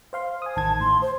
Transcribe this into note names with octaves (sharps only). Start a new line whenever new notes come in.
C5 F5 C6
G#5 D#6
A1 D#3 A5 G#6
A2 C6
C5